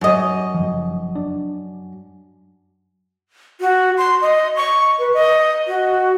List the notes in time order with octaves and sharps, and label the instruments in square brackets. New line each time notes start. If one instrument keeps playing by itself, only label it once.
[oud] F#2 D#5
[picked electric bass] F#1 F3
D4
[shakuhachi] F#4
C6
D#5
C#6
B4
D#5
F#4